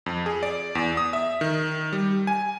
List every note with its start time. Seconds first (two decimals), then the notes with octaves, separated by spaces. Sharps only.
0.06 F2
0.26 G#4
0.43 D5
0.75 E2
0.97 D#6
1.13 E5
1.41 D#3
1.93 G3
2.27 G#5